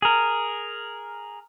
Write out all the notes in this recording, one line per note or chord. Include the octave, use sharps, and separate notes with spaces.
G#4 A#4